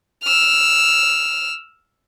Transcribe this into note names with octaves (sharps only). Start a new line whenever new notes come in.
E6 F6